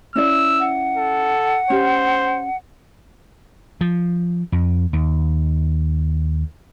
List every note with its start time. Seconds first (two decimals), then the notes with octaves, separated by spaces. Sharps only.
0.16 C#4 E4 D5 E6
0.60 F#5
0.97 A4
1.70 C#4 G4 C5
3.81 F3
4.52 F2
4.93 D#2